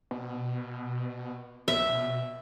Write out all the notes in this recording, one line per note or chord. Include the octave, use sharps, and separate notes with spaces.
B2
A#1 E5
B2